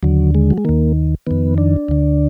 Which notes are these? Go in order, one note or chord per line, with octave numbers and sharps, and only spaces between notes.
D#2 D3 F#3
G#3
F#3
G#3
D#2 D#3 A#3
F2 D#3 B3
D4
D2 D3